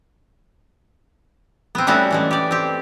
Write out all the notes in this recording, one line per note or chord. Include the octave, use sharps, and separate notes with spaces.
B3 C4
G3 A3 B3 C#4 E4 F#4
E3 G#3 A3
G4 D5
C4 G4